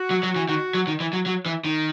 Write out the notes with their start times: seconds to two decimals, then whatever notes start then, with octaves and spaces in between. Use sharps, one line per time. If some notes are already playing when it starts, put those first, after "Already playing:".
Already playing: F#4
0.11 F#3
0.23 F#3
0.36 E3
0.48 D#3 F#4
0.74 F#3
0.87 D#3
1.00 E3
1.13 F#3
1.26 F#3
1.46 E3
1.65 D#3